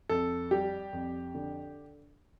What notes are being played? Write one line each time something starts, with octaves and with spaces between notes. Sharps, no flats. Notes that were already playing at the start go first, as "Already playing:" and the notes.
F2 A4
G3 G4
F2
D3